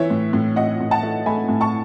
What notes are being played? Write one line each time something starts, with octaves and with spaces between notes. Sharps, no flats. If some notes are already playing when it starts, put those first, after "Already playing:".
Already playing: E3 C#5 E5
A2
A2
A2 D#5 F#5
A2
F#5 A5
A3
A3 G#5 B5
A2
A5 C#6